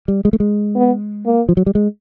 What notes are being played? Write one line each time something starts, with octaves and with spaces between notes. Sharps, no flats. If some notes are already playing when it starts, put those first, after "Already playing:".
G3
G#3
A3
G#3
B3
A#3
F3
F#3
G3
G#3